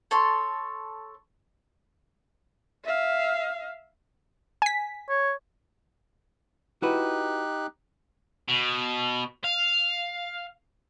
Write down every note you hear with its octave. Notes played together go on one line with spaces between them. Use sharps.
A4 C#5 C6
E5 F5
G#5 B6
C#5
D#4 E4 F#4 G4 B4 F#6
B2
F5